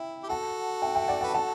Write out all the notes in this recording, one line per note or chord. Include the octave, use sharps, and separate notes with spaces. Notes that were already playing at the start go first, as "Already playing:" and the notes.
Already playing: E4 E5 G5
G4
F#4 A4 F#5 A5
E5 G5
E5 G5
D5 F#5
F#5 A5
B4
F#4 A4 F#5 A5